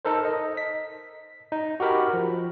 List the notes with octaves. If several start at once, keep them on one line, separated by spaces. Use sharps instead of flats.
D#4 A4 A#4 C5
D#5
B6
D#4
F#4 G4 A#4 B5
F3